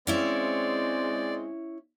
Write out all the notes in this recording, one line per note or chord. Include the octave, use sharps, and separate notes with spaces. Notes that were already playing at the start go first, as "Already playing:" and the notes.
G#3 C4 C#4 E4 D5 F5